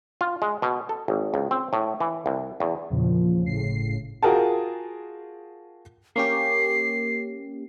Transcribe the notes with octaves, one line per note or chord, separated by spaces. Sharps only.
F4
G#3
B2
A4
G#1
C#2
C4
A2
E3
C2
E2
E2 A#2 C#3 F3
G1 A2 C#3 C7
F4 F#4 G#4 A#4 G5 A5
A#3 C#4 G4 C7